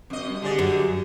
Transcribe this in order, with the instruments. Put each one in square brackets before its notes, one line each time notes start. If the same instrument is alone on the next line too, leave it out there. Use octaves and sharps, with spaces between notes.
[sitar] F#2 D#5 [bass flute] C4
[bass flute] G3
[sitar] D3 G#4 D5 [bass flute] G4
[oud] F#2